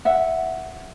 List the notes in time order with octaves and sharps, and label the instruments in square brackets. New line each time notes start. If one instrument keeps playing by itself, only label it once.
[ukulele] E5 F#5